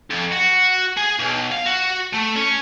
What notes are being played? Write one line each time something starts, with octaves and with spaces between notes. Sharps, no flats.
F2
F#4
G#4
B1
F5
F#4
A3
C#4